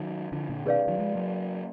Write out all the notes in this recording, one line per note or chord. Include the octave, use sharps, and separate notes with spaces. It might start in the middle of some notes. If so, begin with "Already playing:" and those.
Already playing: D#3 F#3
D3 F3
A#2 D3
B2 D#3 G#4 B4 D5 F5
D#3 F#3
F3 G#3
F#3 A#3